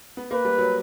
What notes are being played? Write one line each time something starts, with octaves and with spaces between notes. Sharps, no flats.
B3
A#3 B4
G3
F#3